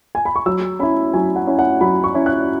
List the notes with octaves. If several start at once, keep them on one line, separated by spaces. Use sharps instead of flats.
G#5
B5
C#6
F#3 E6
C#4 E4 B5
F#3 G#5
F#5
C#4 E4
F#5
F#3 B5
C#6
C#4 E4
F#6